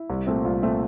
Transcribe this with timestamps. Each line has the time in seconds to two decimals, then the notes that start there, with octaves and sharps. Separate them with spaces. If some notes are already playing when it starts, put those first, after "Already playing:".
Already playing: E4
0.09 C2
0.27 A#2 A3 C4
0.45 C2 F4
0.62 A#2 A3 C4